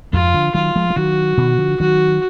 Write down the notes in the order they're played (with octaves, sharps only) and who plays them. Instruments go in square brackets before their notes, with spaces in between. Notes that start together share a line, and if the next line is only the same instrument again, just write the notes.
[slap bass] F2 G#2 [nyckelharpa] F4
[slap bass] D3 F3
[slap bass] D#3 F#3 [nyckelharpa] F4
[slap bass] F3 G#3
G#3
[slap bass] D#3 F#3 [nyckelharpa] F#4
[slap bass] B2 D#3
D3 F3
[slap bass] D#3 F#3 [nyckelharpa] F#4